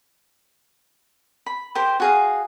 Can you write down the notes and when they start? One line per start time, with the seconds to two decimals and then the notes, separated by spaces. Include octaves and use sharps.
1.46 B5
1.75 G4 A#4 C5
2.00 F#4 G#4 F5